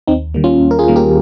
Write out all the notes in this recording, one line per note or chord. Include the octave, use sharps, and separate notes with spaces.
D#2 C4 D#4
D#3 G3 A#3
C#4 F4
D#2
A#4
F4 G#4
D#3 G3 A#3
G4 A#4